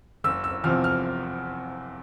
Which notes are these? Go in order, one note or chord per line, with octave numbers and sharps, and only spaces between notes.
F#1 E6
E6
E2 C3 F3 F6
F6